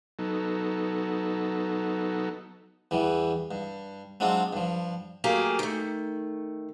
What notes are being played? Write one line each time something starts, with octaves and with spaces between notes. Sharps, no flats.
F#3 B3 D#4 A4
E2 E3 G3
G2
F#3 G#3 C4 D4 F4
G2 F3
F#3 A3 A#3 G4 G#4
D#3 A3